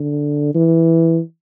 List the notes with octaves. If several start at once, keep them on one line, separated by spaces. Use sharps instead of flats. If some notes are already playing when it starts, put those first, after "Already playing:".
Already playing: D3
E3